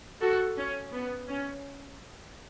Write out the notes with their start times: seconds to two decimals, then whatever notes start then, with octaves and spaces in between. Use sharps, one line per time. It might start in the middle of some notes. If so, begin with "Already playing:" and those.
0.21 F#4 A4
0.57 C#4
0.92 B3
1.28 C#4